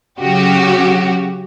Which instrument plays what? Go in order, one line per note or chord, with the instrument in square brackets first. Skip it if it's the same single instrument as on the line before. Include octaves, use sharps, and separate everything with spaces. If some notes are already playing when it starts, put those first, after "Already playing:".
[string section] C#3 F#3 F#4 G4